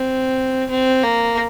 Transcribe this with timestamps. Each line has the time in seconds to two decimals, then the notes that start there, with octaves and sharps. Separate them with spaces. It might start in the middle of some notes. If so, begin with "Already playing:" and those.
Already playing: C4
0.70 C4
1.03 A#3